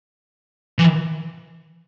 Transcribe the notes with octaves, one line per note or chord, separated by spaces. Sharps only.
E3